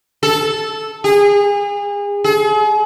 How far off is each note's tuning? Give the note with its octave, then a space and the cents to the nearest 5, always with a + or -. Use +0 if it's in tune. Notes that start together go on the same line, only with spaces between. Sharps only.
A4 -10
G#4 -35
G#4 +40